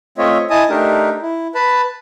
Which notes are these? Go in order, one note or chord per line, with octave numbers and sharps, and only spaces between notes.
A3 C4 F4 C#5 D#5 E5
E4 D#5 G#5 A5 D#6
A3 D4 D#4 G4 A#4
E4
B4 A5 B5